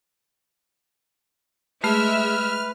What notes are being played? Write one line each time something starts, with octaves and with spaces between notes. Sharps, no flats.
G#3 A3 B4 E5 F6